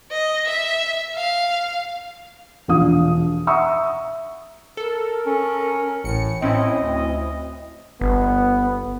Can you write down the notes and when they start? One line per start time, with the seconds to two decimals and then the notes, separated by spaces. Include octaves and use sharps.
0.11 D#5
0.47 E5
1.15 F5
2.68 E1 A#1 F3 F5 D#6
3.47 E5 F#5 A#5 C#6 D#6 E6
4.77 A4 A#4
5.26 C#4
6.04 A1 A2 C#7
6.42 A2 C4 C#4 E4 D#5
6.78 D2
8.01 G1 B3